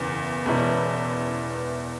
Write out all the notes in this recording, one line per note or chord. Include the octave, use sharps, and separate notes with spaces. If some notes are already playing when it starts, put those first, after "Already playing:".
Already playing: F#1 E2 E3
E1 E2 E3 C#4 E4